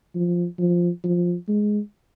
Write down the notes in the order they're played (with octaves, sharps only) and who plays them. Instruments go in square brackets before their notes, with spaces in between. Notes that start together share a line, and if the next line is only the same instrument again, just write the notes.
[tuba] F3
F3
F3
G#3